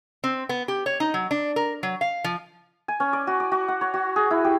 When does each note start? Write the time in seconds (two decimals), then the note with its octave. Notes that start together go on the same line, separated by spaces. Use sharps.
0.24 C4
0.49 B3
0.68 G4
0.86 C#5
1.00 D#4
1.14 F#3
1.31 D4
1.56 A#4
1.83 F#3
2.01 F5
2.24 F3
2.88 G#5
3.00 C#4
3.13 D5
3.27 F#4
3.40 D5
3.52 F#4
3.68 F#5
3.81 C#5
3.94 F#4
4.16 G#4
4.31 E4
4.44 G4